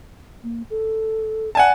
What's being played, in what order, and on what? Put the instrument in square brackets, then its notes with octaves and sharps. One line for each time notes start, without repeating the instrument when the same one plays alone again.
[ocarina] A#3
A4
[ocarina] D5 [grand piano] F#5 G#5 A5